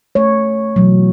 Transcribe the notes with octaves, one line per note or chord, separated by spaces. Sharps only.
A3 C#5
B2 E3 F#3